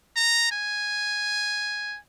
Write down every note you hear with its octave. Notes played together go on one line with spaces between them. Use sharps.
A#5
G#5